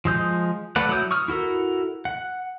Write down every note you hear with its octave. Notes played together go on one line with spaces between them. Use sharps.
F3 G#3 D#6 G6
A3 A4 B4 D5 F#5
F#3 E4 D#6 G6
C#6 D#6 F6
E4 F#4 A4 A#4
F#5